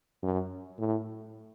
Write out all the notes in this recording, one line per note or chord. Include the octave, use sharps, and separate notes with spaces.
F#2
A2